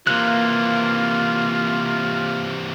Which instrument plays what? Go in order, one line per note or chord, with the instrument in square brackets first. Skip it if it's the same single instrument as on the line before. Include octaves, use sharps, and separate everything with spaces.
[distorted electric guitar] C3 E3 [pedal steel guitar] A#3 F#6 [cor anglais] F4